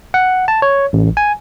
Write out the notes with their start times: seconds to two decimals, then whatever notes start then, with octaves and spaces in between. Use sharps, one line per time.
0.14 F#5
0.48 A5
0.62 C#5
0.93 A1
1.17 G#5